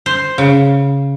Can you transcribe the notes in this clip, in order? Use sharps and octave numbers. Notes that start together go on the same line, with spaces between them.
C5
C#3